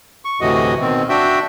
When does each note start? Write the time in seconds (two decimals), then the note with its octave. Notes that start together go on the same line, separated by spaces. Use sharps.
0.25 C#6
0.41 D2 A2 C3 E3 F#4 D#5
0.81 B2 D#3 C4
1.09 D4 F#4 E5 G5